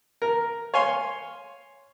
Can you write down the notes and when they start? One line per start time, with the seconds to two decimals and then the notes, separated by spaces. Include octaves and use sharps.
0.22 A#4
0.74 C#5 F5 G#5 C6